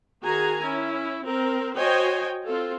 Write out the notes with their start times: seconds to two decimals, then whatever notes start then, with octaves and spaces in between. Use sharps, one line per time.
0.22 D#3 F#4 G#4 G#5 A#5
0.64 C#4 E4
1.25 C4 A#4
1.76 F#4 C5 C#5 D#5 G5 G#5
2.46 C4 F4 A4